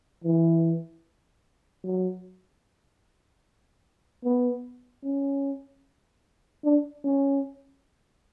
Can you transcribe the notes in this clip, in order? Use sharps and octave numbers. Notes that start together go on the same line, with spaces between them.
E3
F#3
B3
C#4
D4
C#4